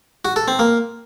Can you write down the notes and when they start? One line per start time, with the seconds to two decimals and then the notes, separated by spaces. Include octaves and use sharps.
0.25 F#4
0.36 A4
0.48 C4
0.59 A#3